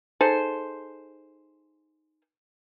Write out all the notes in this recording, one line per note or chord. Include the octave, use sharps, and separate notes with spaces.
D#4 G#4 A4 C5